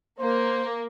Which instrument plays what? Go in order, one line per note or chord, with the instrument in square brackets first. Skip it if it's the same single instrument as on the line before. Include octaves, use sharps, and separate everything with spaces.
[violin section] A#3 [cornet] C5